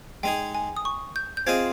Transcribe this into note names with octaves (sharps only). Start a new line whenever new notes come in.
G#3 D#4 G#4 G5
G#5
D#6
C#6
G6
G6
C4 F4 G#4 D#5 G#6